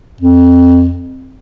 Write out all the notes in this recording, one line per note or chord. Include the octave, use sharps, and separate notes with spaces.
F2